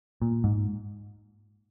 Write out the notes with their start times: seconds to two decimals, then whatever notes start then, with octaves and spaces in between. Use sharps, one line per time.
0.22 A#2
0.44 G#2